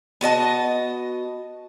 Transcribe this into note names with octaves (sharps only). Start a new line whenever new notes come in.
B3 F#4 D#5 A5